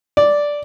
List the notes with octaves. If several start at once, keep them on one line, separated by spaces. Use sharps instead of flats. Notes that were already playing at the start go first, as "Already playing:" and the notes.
D5